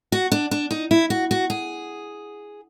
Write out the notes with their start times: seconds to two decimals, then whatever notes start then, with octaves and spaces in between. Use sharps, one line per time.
0.12 F#4
0.32 D4
0.51 D4
0.71 D#4
0.91 E4
1.10 F#4
1.31 F#4
1.50 G#4